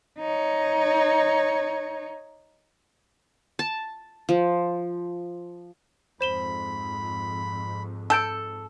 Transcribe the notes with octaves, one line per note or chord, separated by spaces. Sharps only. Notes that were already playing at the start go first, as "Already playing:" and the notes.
D#4 C#5
A5
F3
F2 G#2 C5 B5 E7 G7
A4 E6 G6 D7